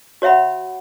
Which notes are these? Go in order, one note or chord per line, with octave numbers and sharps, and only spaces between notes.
F#4 C#5 E5 F#5 B5